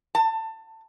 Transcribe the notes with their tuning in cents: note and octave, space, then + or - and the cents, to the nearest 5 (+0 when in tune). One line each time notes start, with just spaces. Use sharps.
A5 +25